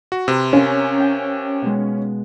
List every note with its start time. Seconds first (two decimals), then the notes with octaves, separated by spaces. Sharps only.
0.12 F#4
0.28 C3 B4 A5 C6
0.53 C#4 A#4 F5
0.97 G5 G6
1.62 B2 G#3